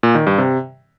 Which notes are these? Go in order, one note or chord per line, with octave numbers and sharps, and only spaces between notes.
A#2
D#3
G2
C3